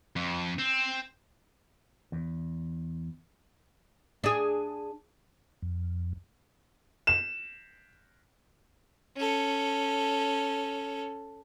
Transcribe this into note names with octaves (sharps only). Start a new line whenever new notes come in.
F2
C4
E2
D4 G#4
F2
E7
C#4 A4